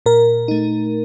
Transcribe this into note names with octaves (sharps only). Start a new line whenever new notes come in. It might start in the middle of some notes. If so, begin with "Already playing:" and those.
A#2 A#4
A3 D#4